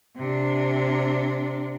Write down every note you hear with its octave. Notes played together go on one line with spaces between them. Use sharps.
C3 D4